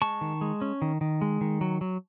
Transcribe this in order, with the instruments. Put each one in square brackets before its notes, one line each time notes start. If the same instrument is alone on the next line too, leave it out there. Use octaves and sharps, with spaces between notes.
[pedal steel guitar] G#3 A5 C#6
D#3
G#3
C#4
D#3
D#3
G#3
D#3
F#3
F#3